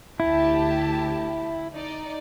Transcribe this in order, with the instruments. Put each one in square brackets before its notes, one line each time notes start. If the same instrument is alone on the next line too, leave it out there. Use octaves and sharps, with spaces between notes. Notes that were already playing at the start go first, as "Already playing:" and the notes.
[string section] D2 G4 A5 [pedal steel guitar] E4
[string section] D#4 D5